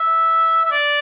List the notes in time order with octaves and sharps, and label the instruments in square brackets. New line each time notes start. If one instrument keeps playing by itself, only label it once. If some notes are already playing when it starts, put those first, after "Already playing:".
Already playing: [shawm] E5
E5
D5